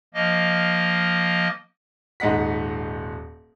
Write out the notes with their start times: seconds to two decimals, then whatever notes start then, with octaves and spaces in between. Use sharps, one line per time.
0.14 F3 A#3 D#5
2.20 D#1 G#2 D#5 F#5 B6